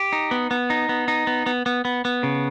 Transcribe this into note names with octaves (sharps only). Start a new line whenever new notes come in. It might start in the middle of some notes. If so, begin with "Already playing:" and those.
Already playing: G4
D#4
B3
B3
D#4
B3
D#4
B3
B3
B3
B3
B3
C#3